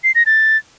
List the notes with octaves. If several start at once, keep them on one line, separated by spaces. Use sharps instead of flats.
C7
A#6
A6